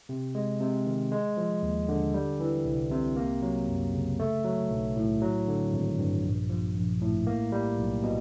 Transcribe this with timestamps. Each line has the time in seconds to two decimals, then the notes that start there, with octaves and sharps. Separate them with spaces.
0.09 C3
0.35 G#3
0.60 C3
0.86 D#3
1.12 G#3
1.37 F3
1.63 D#2
1.88 D3
2.14 G3
2.40 E3
2.65 C2
2.91 C3
3.17 A#3
3.42 F#3
3.68 F#2
3.94 C#3
4.19 A3
4.45 F#3
4.71 B1
4.96 A2
5.22 F#3
5.48 D3
5.73 G#1
5.98 G2
6.24 A#1
6.50 F3
6.75 A#1
7.01 A2
7.27 A#3
7.52 G3
7.78 B1
8.03 B2